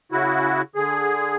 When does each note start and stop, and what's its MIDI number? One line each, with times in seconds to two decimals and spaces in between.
0.12 0.62 49
0.12 0.62 64
0.12 0.62 66
0.75 1.37 50
0.75 1.37 68